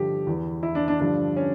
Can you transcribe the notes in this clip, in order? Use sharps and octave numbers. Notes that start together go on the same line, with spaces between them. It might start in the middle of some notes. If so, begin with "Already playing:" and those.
Already playing: G2 D3 F3 G4
E2 E3
E4
D4
D4
G2 D3 F3 D4
C#4